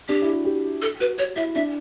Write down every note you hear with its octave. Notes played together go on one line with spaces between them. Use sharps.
D4 G4
E4
F#4
G4
A4
F#4 B4
F#4 C#5
E4 E5
D4 E5